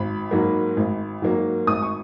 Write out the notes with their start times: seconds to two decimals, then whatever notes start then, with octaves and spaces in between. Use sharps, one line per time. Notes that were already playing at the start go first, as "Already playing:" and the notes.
Already playing: G#1 B5
0.31 G#2 F#3 A#3
0.77 G#1
1.22 G#2 F#3 A#3
1.67 G#1 D#6
1.82 C#6